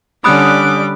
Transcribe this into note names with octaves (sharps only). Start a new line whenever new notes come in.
D3 G3 C#4 B5 D6 D#6 F#6